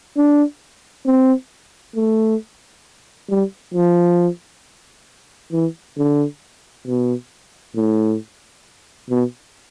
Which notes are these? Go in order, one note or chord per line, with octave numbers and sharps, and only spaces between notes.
D4
C4
A3
G3
F3
E3
D3
B2
A2
B2